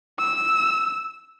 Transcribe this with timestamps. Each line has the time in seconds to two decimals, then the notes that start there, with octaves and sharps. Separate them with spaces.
0.19 E6